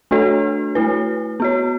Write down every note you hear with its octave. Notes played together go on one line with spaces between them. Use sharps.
A3 D4 F#4 A4 C#5
A3 E4 B4
B3 F#4 C#5